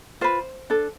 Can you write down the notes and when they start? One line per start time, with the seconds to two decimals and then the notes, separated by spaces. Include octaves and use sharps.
0.21 F4 B4 C5
0.70 D4 A4